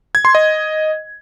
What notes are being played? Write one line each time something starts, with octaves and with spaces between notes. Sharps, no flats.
G#6
C6
D#5